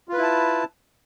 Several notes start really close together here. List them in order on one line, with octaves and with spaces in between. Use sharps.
F4 B4 E4 A5